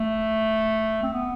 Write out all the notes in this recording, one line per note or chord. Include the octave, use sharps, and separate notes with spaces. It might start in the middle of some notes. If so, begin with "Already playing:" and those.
Already playing: A3
C4
B3